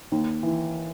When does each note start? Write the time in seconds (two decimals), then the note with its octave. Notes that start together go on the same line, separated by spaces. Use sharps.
0.12 D#2
0.43 E3